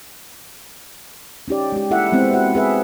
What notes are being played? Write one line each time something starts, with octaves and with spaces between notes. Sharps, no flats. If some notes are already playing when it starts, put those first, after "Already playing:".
C#4 D#4 G4 D5
G#3 G4
A#3 E4 A4 E5 F#5
G#3 B3 C4 E4
F#4 F#5
G#4 B4 E5